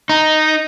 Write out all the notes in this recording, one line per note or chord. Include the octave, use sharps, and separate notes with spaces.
D#4